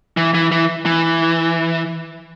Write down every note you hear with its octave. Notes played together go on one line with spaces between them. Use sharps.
E3
E3
E3
E3